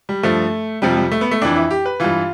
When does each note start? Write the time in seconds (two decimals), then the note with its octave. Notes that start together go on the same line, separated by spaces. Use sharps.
0.09 G3
0.23 G2 F3 A3
0.82 F2 C3 F3 G3
0.97 G3
1.12 A3
1.21 B3
1.31 A3
1.42 F2 E3 D4
1.56 E4
1.71 G4
1.86 B4
2.00 G2 E3 F4